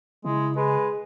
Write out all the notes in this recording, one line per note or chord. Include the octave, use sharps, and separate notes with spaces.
C#3 G#3 E4
G#3 G#4 B4